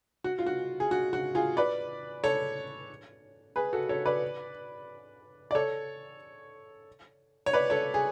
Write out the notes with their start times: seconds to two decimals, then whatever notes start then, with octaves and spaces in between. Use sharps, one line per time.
0.24 F#4
0.39 F4
0.46 F#4
0.80 G#4
0.91 F#4
1.13 F#4
1.35 F4 G#4
1.57 B4 D5
2.24 A4 C#5
3.56 G#4 B4
3.73 F#4 A4
3.89 A4 C#5
4.06 B4 D5
5.51 D5
5.55 A4 C#5
7.46 C#5
7.53 B4 D5
7.70 A4 C#5
7.94 G#4